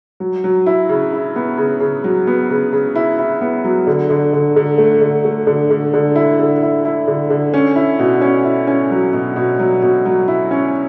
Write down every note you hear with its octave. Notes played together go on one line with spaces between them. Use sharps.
F#3
F#3
E4
C#3
E4
B3
C#3
C#3
F#3
B3
C#3
C#3
E4
E4
B3
F#3
D3
D3
D3
D3
A3
D3
A3
D3
D3
D3
E4
D3
E4
E4
D3
D3
C#4
E4
B2
C#4
E4
C#4
F#3
B2
B2
F#3
B2
F#3
E4
C#4